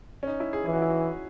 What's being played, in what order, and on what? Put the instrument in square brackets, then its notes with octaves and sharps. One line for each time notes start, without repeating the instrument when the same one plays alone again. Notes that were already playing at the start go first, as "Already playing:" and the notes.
[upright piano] C#4
D#4
E4
G#4
[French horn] E3 [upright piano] G#4
[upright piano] F#4
E4
F#4